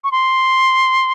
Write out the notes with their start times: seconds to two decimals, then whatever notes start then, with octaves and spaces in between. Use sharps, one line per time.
0.04 C#6
0.12 C6